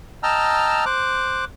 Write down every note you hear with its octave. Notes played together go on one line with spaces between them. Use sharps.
D#5 G5 A5 A#5 E6 F6
C5 D6 F#6